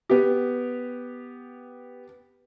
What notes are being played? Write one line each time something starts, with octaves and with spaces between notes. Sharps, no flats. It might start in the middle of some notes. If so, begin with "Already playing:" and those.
B3 G4